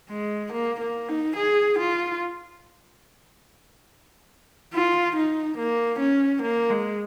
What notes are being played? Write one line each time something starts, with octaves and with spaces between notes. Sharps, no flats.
G#3
A#3
A#3
D#4
G#4
F4
F4
D#4
A#3
C#4
A#3
G#3